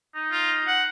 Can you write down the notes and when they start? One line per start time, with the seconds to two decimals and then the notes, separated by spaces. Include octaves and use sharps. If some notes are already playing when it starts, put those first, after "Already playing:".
0.15 D#4
0.31 F4
0.67 F#5